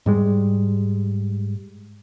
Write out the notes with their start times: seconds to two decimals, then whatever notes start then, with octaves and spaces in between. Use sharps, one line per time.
0.06 G#2 G3 G#3